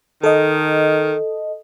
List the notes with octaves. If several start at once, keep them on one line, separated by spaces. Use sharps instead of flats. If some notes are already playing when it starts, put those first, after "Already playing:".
D#3 A4 D#5